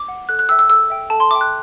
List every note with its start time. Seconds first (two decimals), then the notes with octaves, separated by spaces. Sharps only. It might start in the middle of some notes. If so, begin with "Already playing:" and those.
Already playing: D6
0.08 F#5
0.29 A4 F#6
0.39 F#6
0.49 E5 G5 E6
0.59 E6
0.69 A4 E6
0.90 E5 G5
1.10 A4 A5
1.20 C6
1.31 E5 G5 D6
1.41 F#6